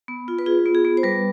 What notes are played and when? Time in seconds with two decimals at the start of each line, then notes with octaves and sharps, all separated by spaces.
0.08 B3
0.28 F4
0.39 B4
0.46 F4 G#4
0.66 B3
0.75 G#4
0.85 B3
0.97 C5
1.03 G3 B4